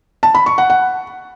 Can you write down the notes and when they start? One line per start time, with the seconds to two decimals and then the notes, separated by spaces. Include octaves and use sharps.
0.23 A5
0.35 B5
0.46 C#6
0.58 F#5
0.70 F#5